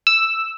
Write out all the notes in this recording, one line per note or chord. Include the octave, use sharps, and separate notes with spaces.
E6